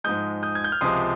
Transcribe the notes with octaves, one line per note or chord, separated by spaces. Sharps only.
G#2 F3 G#3 D#6 G6
D#6 G6
G#6
G6
F6
C#2 C3 F3 G#3 C6 D#6